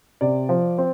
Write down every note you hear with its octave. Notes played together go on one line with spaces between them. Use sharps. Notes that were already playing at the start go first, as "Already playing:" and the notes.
C3 D5
F3
C4